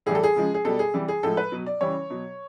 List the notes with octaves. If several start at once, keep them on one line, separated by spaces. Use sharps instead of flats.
A2 E3 G3 G#4
A4
G#4
C#3 F3 G#3
G#4
B2 G3 A4
G#4
C3 E3 G3
G#4
A2 F3 G#3 A4
B4
B2 F#3
D5
C#3 E3 G3 C#5
B2 F#3